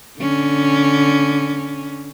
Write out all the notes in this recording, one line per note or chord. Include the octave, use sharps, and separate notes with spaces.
D3 C#4